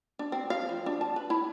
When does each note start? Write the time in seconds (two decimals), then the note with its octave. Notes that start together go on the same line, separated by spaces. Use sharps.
0.19 D4
0.32 C4
0.50 F5
0.69 F3
0.86 D4
1.01 A5
1.16 B4
1.30 E4